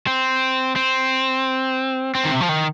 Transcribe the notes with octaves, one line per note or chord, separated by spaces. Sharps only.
C4
C4
C4
D#3
C3
F3
D#3